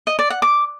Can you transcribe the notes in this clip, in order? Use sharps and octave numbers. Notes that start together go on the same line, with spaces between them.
D#5
D5
F#5
D6